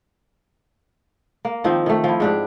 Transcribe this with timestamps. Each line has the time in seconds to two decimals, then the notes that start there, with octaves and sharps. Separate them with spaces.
1.45 A#3
1.64 D#3 F3 C4
1.86 D#3 A3
2.04 F3 E4
2.20 G#2 D4 G4